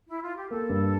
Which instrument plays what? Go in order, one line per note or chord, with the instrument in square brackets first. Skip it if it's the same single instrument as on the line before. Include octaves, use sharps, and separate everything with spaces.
[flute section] E4
F4
G4
[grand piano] A#3 [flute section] A4
[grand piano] G2